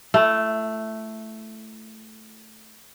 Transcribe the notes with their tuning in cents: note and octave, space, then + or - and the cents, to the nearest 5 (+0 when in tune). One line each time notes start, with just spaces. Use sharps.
A3 +0 E4 +35